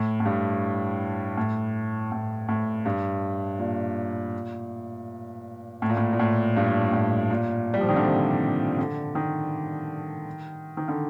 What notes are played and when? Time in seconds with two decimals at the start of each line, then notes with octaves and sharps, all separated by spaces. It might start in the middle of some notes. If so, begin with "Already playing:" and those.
Already playing: A2
0.20 A2
0.25 G2
1.37 A2
2.12 A2
2.48 A2
2.85 G2
3.59 A#2
5.82 A2
5.89 A#2
5.97 A2
6.13 A#2
6.19 A2
6.56 G2
6.93 A2
7.30 A#2
7.74 G3
7.81 F3
7.89 D#3
7.96 D3
8.04 C3
8.78 D3
9.15 D#3
10.77 D#3
10.88 D3